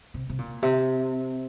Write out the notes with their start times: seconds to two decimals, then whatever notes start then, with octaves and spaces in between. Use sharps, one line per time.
0.14 C3
0.29 C3
0.38 A#2
0.62 C3